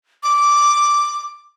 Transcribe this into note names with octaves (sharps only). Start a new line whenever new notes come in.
D6